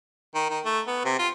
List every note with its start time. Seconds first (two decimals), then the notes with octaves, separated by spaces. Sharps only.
0.35 D#3
0.50 D#3
0.65 A3
0.87 B3
1.05 C3
1.19 F4